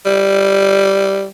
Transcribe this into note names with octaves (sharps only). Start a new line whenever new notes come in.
G3